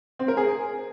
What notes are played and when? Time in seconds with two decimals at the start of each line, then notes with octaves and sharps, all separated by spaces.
0.19 C4
0.28 A#4
0.37 G#4